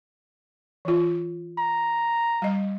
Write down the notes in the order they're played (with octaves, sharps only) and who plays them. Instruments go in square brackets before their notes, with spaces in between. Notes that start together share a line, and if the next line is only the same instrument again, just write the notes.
[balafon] E3 F4
[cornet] A#5
[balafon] G3 D#5